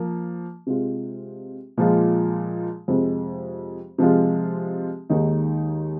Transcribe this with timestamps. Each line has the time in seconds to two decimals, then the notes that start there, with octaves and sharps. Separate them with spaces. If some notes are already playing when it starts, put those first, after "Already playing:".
Already playing: F3 A#3
0.67 C3 G#3 F4
1.77 A#2 F3 G#3 F4
2.88 F2 C3 G#3
3.98 C3 F3 G#3 F4
5.10 D#2 D#3 G#3 D#4